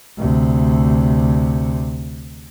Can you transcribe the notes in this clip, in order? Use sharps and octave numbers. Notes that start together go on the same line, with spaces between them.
D2 C3